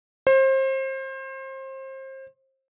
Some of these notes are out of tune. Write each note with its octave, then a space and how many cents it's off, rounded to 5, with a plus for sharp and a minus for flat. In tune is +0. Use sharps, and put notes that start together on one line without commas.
C5 +30